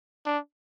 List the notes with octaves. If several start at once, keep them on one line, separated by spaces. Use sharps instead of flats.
D4